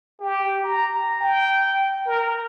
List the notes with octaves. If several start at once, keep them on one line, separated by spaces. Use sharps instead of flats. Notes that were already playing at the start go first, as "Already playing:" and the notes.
G4
A#5
G5
A#4